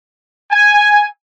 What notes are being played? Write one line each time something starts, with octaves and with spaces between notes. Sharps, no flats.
G#5